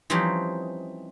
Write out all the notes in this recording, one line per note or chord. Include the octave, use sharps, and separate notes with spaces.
E3 F3 G3 C4 C#4 D#4